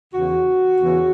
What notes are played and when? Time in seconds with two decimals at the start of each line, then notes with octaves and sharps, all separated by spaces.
0.14 E2 C#3 E3 F#4
0.78 E2 C#3 E3